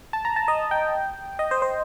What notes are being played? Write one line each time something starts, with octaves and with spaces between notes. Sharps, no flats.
A5
A#5
A5
D#5
G5
D#5
C5
C5